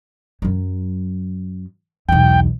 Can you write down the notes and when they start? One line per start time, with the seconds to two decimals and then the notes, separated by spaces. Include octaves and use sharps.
0.42 F#2 F#3
2.09 B1 E2 G5